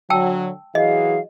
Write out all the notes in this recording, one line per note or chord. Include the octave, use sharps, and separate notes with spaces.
D3 F#3 G5 A5 E6
E3 F#3 G#4 D#5 F5